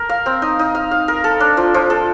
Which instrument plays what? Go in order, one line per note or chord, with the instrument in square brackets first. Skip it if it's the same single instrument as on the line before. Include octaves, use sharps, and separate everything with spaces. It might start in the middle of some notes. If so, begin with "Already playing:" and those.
Already playing: [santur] A#4
F5
C4
D#4
D#4
F5
F5
A#4
A4
D4
F3
F3
A4